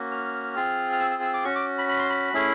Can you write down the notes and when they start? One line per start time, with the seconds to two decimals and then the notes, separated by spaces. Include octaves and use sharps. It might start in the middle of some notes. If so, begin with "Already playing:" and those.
Already playing: A#3 C#4 F#4
0.11 F6
0.56 C4 F4 G#4
0.92 F6
1.00 E6
1.10 E6
1.22 E6
1.34 D6
1.44 C#4 F#4 C#6
1.55 D6
1.78 B5
1.89 B5
1.99 C6
2.10 B5
2.33 A3 C#4 E4 G#4